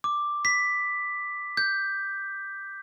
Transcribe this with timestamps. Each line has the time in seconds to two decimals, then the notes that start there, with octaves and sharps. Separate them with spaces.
0.04 D6
0.45 B6
1.57 G6